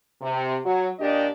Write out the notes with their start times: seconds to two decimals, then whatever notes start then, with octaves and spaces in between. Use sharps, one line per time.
0.22 C3
0.64 F#3
0.99 A#2 D4 G4 D#5